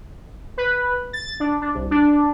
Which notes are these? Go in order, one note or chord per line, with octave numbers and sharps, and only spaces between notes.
B4
A6
D4
D4
C2
D4